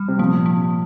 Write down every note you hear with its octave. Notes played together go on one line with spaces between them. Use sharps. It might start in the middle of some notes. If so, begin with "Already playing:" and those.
Already playing: G3
C3
A#2 F3
F3